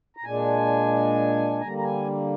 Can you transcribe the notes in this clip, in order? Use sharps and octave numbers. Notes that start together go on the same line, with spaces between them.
A#5
A#2 G#3 D4 G#5
D3 G3 A#3 A#5
A#5
G#5